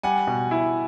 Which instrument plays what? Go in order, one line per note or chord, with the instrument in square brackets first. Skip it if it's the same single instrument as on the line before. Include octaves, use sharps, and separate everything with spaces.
[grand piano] G3 [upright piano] F#5 G#5
[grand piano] B2
E4